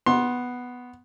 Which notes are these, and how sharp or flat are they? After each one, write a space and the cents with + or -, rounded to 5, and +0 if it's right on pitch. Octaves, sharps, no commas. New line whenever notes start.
B3 +0 C6 +20